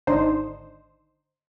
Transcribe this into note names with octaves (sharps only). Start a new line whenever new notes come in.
G#1 D3 D4 D#4 C5